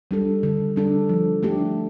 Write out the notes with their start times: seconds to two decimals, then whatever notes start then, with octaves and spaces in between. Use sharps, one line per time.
0.11 G3 D4 A4
0.43 D3
0.76 G3 D4 A4
1.09 F3
1.43 A3 D4 G4